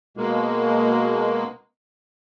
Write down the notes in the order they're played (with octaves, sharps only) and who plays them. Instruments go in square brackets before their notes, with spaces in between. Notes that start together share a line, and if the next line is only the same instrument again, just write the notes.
[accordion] B2 G#3 A#3